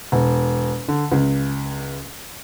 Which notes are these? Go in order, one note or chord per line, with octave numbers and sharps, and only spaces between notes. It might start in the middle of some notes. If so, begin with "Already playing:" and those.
E1
D3
C#2